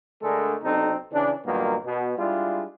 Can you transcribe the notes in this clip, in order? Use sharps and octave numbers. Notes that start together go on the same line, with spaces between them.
D3 G#3 A3 D4 A4 A#4
B1 C3 C4 D4 D#4 A4
C#3 E3 C#4 D4
G2 A#2 D#3 F#3 A#3 B3
B2
G3 G#3 D4 E4 F4